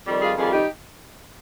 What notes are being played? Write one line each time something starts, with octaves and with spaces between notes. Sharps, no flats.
F2 D#3 G3
F4 G#4
F2 D#3 G3 F4 G#4
D#4 G4